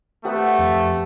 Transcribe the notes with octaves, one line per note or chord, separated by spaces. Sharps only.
A3 G4 B4 F#5 D#6 E6
F2